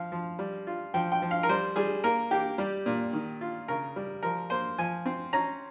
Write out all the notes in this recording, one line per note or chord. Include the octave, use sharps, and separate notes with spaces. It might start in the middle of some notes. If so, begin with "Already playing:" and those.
Already playing: F3 F5
F3
G3
F4
F3 G5
G5
F3
F5
A#4
G3 C5
G3 G#4
A#3 A#4
A#3 G4
G3
A#2
D#3
F4
C#3 A#4
G3
F3 A#4
A#3 C5
F3 G#5
C4
C#4 A#5